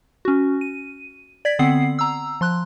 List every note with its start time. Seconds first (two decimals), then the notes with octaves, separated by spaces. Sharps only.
0.25 C#4 F#4
0.61 D#7
1.45 D5 G#6 B6
1.59 D3 B3 C4 F#5 C7
1.99 A#5 E6
2.41 F3 C6 F#6